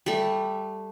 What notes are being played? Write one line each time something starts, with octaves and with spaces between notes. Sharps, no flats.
G3 A3